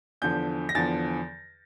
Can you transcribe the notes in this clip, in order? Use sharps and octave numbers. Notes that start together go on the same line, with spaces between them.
E2 D3 F3 G6
A#6
E2 D3 F3 A6